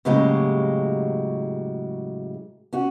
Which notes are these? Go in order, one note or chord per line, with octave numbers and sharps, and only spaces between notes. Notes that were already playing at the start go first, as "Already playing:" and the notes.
A2 C#3 F#3 G#3 A#3 G4
C#4 F#4